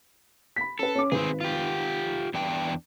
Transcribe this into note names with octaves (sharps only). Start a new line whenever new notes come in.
B5 B6
C#4 A4 B4
C#4 D6
G#1 C4 G#4 B4
F4 G4
E2 D4 G5